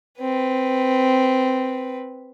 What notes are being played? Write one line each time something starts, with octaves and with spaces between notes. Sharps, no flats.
C4 B4